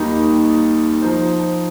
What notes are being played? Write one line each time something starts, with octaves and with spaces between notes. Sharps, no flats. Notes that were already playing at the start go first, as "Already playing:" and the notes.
Already playing: D#2 D#3 G3 A#3 D#4
F3 D#4 C5